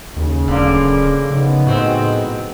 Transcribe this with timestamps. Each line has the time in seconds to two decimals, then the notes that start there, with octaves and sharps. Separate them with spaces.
0.17 D#2 C#3
0.48 D1 D3 A#3
1.31 C#3 F3 B3 D#4
1.67 A2 G#3 C4 F#4